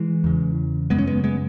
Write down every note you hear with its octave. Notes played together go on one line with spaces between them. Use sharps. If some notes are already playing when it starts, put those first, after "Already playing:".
Already playing: E3 G#3
E2 C#3
F#2 C#3 G#3 B3
C#4
G#3 B3
G#3 B3